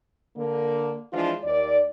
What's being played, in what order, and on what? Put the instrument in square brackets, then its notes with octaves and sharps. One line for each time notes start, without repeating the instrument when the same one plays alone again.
[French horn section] D3 A#3
E3 F3 G#3 D4 F4
D#2 D5